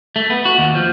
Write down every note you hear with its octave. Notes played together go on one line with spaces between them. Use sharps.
A3
B3
F#4
D#2
F3